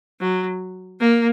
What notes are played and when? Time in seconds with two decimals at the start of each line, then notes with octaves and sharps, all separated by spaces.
0.20 F#3
1.00 A#3